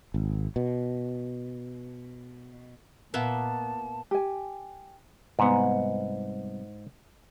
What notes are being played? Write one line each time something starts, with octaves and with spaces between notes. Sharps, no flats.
G#1
B2
A#2 A#3 B3 E5 A5
G4 G#5
C2 G#2 B3